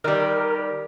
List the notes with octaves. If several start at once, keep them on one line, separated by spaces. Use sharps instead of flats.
D#3 G3 A#4 D5